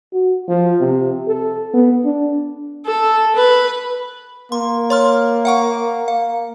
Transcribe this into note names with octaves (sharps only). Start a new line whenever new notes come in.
F#4
F3
C3
A4
B3
D4
A4
B4
A#3 C6
C#5 C6 F6
F5 F#5 C#6
F5